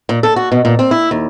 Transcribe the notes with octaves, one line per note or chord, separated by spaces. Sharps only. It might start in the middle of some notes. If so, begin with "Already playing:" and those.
A#2
A4
F#4
B2
A#2
C4
E4
D#2